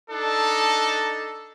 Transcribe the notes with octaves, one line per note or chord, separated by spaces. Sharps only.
D4 D#4 A4